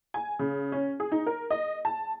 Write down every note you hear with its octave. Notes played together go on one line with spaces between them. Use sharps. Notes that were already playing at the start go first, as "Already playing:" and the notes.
G#5
C#3
C#4
G#4
D#4
A#4
D#5
A5